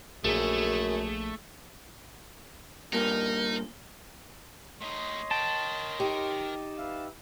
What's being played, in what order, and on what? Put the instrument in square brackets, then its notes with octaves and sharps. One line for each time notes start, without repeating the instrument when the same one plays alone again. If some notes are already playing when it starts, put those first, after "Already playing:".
[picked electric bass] A#1 A#2 [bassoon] F#2 [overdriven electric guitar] A3 [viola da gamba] G#4
[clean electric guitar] G2 A#2 [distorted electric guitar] D#4 [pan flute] A#4
[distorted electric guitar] A2 D#4 [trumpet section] C#5 D#5 C6
[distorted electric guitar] A#4 G5 [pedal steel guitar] A5
[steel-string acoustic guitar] D#4 G4
[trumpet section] B4 E5 F5